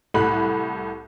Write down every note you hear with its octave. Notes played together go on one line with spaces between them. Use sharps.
C2 A2 B5 F#6